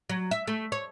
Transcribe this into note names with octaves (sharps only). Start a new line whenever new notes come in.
F#3
E5
A3
C#5